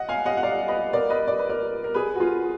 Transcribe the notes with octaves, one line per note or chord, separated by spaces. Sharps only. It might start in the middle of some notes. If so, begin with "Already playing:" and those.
Already playing: D#5 F#5
F5 G#5
D#5 F#5
F#5
D5 F5
B4 D#5
A#4 D5
B4 D#5
D5
B4
A#4 D5
A#4
G#4 B4
F#4
F4 G#4